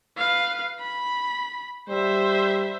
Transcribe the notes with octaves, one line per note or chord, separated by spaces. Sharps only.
B4 F5
B5
G3 C5 E5